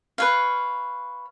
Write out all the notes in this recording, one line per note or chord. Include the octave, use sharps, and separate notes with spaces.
B4 C#5 F5